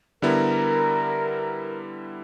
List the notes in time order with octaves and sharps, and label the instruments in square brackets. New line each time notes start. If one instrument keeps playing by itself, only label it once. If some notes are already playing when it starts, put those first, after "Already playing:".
[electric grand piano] D3 G3 B3 E4 [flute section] A#4